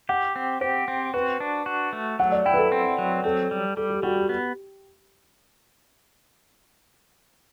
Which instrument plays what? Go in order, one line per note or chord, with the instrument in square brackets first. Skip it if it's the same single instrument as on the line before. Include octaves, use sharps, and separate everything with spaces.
[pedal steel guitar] G4 [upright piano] F#5
[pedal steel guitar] C4
[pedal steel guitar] G4 [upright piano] C5
[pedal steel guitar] C4
[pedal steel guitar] F#4 [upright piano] B4
[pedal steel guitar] D4
F#4
A3
[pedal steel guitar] F#3 [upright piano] F#5
[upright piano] D5
[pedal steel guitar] E4 [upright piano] G5
[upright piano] B4
A4
[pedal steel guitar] C4
F#3
[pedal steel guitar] C4 [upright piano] A4
[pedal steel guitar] G3
[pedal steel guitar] G3 [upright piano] A4
[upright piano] G4
[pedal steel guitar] G3 [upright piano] F#4
[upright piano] G4
[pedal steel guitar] B3